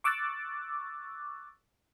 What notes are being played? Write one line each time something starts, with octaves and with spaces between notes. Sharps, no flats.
C#6 D6 E6 F#6 A6